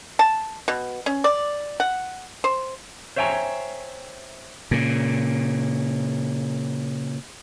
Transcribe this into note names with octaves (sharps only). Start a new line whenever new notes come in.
A5
B2
C#4
D5
F#5
C5
C5 C#5 E5 G5 G#5 A#5
A#2 C#3